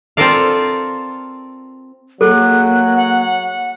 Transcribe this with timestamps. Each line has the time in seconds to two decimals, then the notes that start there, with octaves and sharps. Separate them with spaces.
0.17 C4 F4 A4 A#4 D5 F5
2.21 F#3 A#3 G#4 A4 F#6
2.96 F#5